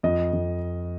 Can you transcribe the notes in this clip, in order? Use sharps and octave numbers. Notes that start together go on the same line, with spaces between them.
F2 D#5
F2